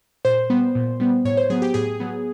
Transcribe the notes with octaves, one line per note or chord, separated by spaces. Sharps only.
A#2 C5
G3 B3
A#2
G3 B3
A2 C#5
C5
F#3 B3 G#4
G4
A2 G#4
F#3 B3